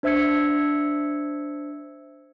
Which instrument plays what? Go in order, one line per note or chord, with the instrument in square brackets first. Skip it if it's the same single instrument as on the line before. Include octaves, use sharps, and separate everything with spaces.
[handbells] D4 C5 E5 E6 G#6 C#7